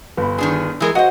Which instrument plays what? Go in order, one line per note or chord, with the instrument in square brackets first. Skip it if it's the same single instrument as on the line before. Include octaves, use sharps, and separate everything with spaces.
[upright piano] G1 B5
[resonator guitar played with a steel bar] D#3 D4 G#4
E3 G#3 A#4
[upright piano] F#4 D#5 [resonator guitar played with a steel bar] C5 F#5